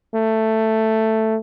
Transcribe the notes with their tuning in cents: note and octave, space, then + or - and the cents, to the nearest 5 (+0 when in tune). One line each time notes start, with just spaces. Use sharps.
A3 +5